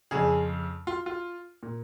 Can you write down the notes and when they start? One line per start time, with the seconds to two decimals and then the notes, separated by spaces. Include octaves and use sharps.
0.11 F2 C#3 G#4
0.87 F4
1.06 F4
1.63 A#2